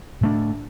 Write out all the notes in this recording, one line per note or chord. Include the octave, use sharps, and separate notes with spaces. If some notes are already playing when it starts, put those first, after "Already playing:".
A2 A3 D4